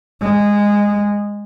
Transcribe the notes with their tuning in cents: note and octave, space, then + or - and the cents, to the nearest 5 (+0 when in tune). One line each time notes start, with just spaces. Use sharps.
G#3 -15